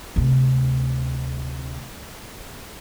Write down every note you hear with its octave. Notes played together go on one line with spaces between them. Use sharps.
D2 C3